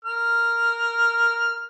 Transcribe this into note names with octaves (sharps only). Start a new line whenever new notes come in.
A#4 F6